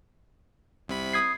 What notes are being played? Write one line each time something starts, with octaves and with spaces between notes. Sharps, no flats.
C2 C3 B5
D#6 G#6 C7